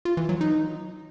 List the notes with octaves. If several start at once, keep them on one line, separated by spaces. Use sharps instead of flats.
F4
E3
F#3
D#4